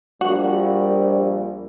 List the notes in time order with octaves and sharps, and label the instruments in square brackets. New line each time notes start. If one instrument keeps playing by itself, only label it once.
[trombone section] A#1 [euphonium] G3 [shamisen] F#4